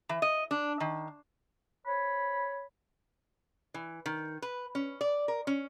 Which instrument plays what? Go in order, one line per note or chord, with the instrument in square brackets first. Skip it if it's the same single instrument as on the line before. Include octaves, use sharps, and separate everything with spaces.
[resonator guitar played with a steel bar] E3
D#5
D4
D#3
[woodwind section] C5 C#5 B5
[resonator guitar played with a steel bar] E3
D#3
B4
C#4
D5
A#4
C#4